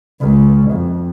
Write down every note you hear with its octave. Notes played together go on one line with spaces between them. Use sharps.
C#2
F2